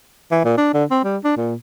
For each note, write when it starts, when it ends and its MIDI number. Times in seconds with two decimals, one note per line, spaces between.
0.31 0.40 52
0.45 0.53 46
0.57 0.71 62
0.74 0.84 50
0.91 0.99 60
1.04 1.17 55
1.24 1.34 62
1.37 1.55 46